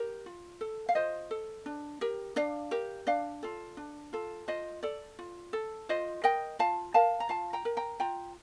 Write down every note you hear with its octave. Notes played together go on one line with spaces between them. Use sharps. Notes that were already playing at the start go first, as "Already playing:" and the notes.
Already playing: G4 A#4
F4
A4
F5
F4 C5 D#5
A4
D4
G4 A#4
D4 D5 F5
G4 A#4
D4 D5 F5
F4 A4
D4
F4 A4
F4 C5 D#5
A4 D5
F4
A4
F4 C5 D#5
A#4 D#5 G5
F4 F5 A5
A#4 F5 A5
A#5
F4 F5 A5
G5 A#5
A#4
G5 A#5
F4 G5 A#5